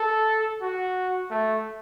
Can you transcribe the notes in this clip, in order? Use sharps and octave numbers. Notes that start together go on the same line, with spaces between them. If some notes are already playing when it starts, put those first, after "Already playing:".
Already playing: A4
F#4
A3